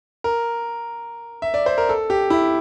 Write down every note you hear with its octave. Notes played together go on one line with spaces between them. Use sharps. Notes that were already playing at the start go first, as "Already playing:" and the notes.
A#4
E5
D5
C5
A#4
A4
G4
E4